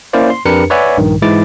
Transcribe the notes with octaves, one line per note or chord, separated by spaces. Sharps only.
A#3 C#4 E4 C5 D5 F5
C6
F2 D4 G4 A#4 B4 C#7
B4 C#5 D5 E5 F#5 G#5
A#1 G2 D#3
G#2 E3 G#3 E4 D6 A6